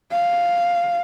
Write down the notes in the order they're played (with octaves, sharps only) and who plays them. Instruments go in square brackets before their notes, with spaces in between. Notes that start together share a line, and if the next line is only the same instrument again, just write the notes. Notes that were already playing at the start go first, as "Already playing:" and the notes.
[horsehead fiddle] F5